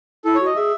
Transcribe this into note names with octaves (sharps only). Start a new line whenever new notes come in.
E4 A4
C#5
F#4
D#5
G#4 E5